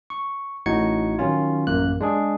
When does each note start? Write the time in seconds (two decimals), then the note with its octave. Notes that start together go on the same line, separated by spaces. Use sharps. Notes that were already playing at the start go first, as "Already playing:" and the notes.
0.10 C#6
0.66 A1 A2 D#4 F#4 G#6 C#7
1.19 D#3 F#3 C#4 F4
1.67 A1 F#2 A#3 F#6
2.01 G#3 D4 G#4